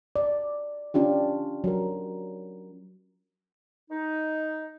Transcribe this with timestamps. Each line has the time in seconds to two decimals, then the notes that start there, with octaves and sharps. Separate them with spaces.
0.16 D5
0.94 C#4 D4 F4 G4
1.64 F#3 A#4
3.90 D#4